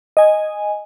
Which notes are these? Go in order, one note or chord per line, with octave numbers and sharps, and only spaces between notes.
D#5 G#5